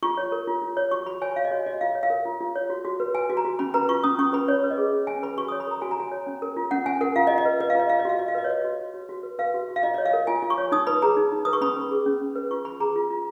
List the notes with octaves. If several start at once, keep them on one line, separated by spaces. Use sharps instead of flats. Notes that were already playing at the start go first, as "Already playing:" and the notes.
F4 C#6
C#5
A#4
F4
F4
C#5
F#4 C#6
F#4 B5
C#5 G#5
C#5 F5
D#5
F#4 C#5
F#4 D#5
F4 F5
C#5
F5
A#4
F4
F4
C#5
F#4
F#4
B4
B4 G#5
F#4
A#5
F#4
C#4 B5
B4 A#5
F4 C#6
C#4 D#6
C#4 C#6
B4 B5
C#4 C#5
B4
D#5
G#4
C#4
C#4 G#5
B4 B5
F#4 C#6
C#5 D#6
B5
A#4 A#5
F#4 G#5
A#5
F#4 G#5
C#5
C#4
A#4
F4
C#4 F#5
C#4 G#5
A#4 F#5
F4 F5
D#5
F4
D#5
B4
B4 D#5
F5
F4 D#5
F4 F5
D#5
F#4 F5
F#4 D#5
F5
B4 D#5
C#5
B4 D#5
F#4
F#4
F#4
F#4
B4
B4 F5
F#4
F#4
F5
F4 D#5
C#5 D#5
F5
A#4
F4 G#5
F4
C#6
C#5
D#4 D#6
B4 B5
G#4 A#5
D#4
D#4
B4 D#6
C#6
C#4 B5
B4
G#4
C#4
C#4
B4
F4 C#6
B4 B5
G#4 A#5
F4
F4